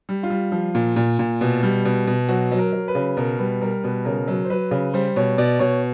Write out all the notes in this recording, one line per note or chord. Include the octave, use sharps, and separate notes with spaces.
G3
F4
G3
F3
A#2
A#2
A#2
B2
G3
B2
B2
F#3 F#4
F#3
A#4
F#3
B4
C#3
B2 A#4
G3 B4
G3 A#4
B2 B4
C#3 A#4
F#3
C5
F#3 B4
C#3
G3 C5
B2 C#5
B2 D5
B2 C#5